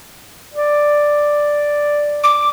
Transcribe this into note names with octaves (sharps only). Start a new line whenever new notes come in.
D5
D6